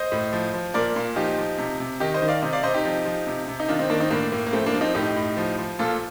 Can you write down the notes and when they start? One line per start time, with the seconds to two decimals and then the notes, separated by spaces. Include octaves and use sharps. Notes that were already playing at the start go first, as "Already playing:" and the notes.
Already playing: C5 D#5
0.12 A2
0.33 F3
0.54 F3
0.74 A#2 A#4 D5
0.96 A#2
1.16 F3 D#4 G4
1.38 F3
1.58 C3
1.80 C3
2.00 D#3 D#4 G4
2.14 C5 D#5
2.22 D#3
2.28 D5 F5
2.42 C3 C5 D#5
2.53 D5 F5
2.63 C3 C5 D#5
2.74 D#4 G4
2.85 F3
3.05 F3
3.27 C3
3.48 C3
3.60 D#4
3.68 D#3 D4 F4
3.79 C4 D#4
3.90 D#3 A#3 D4
4.00 C4 D#4
4.11 A2 A#3 D4
4.32 A2 A#3
4.47 A#3
4.52 F3 A3 C4
4.66 A#3 D4
4.74 F3
4.81 C4 D#4
4.95 A2 D#4 G4
5.16 A2
5.37 F3
5.58 F3
5.79 A#2 F4 A4